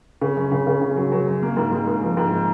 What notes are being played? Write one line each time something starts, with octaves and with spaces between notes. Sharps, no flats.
C#3
F#2
C#3
C#3
C#3
F#3
F#3
F#2
A#3
G#2
G#2
G#2
F3
G#2